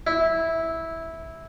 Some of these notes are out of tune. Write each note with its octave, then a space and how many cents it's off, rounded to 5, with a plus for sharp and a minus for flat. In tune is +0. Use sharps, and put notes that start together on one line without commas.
E4 -10